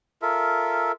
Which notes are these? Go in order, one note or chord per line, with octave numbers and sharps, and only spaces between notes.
F4 A4 A#4 E5